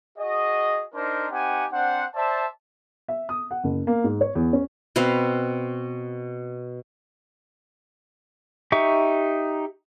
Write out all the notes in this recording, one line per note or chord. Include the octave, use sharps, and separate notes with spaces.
F#4 G#4 D#5
D4 D#4 A#4 C5
C4 D#4 G4 F#5 G#5
C4 D4 C5 F#5
C5 D5 E5 A5
E5
D#6
F#5
F#1
A#3
G#2
C#5
E2
C#4
B2 C4 B4 F5
D#4 G4 E5 C#6